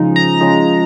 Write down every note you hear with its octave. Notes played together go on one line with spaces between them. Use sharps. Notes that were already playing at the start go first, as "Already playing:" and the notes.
Already playing: C#3 F3 G#3 D#4
A#5
C#3 F3 G#3 D#4